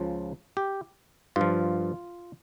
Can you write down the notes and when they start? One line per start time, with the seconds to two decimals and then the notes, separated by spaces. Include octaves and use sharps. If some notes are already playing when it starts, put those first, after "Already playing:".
Already playing: C#2 C#3 F3
0.57 G4
1.36 G2 F3 F4